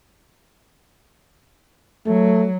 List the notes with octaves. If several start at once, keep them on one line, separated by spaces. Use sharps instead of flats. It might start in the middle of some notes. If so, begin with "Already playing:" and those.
F#3 A3